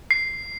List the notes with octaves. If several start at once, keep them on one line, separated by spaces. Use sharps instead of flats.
C7